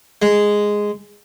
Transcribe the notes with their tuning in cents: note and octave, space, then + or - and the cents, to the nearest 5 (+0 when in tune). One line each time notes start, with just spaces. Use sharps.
G#3 -5